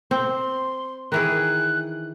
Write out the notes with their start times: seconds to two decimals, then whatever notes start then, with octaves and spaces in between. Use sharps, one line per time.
0.11 C4 C6
1.12 D#3 E3 G#4 F#6